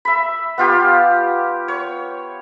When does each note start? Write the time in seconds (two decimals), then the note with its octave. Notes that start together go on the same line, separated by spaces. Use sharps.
0.05 E5 B5
0.58 B3 F4 G4
1.68 C#5